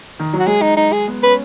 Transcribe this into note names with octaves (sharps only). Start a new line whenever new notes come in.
D#3
F#3
F#4
G#3 G#4
D#4
D#4
G#4
B3
C#4 B4